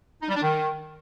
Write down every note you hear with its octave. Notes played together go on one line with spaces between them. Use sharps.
D#4
G3
D4
D#3